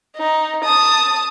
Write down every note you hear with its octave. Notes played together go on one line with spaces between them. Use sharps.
D#4
A5 D#6